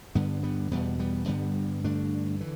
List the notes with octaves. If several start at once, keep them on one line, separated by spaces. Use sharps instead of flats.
G2 D3 G3 B3
G3 B3
E2 B2 G3 B3
G3 B3
G2 D3 G3 B3
G2 D3 A3 D4
D3 E3